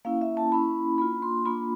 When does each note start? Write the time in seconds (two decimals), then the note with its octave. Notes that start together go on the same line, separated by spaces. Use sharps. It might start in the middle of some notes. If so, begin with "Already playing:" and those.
0.05 A#3 C#4 E4 F5
0.21 E5
0.37 A5
0.52 A#3 C#4 E4 B5
0.98 A#3 D4 F4 B5
1.22 C6
1.46 A#3 D4 F4 B5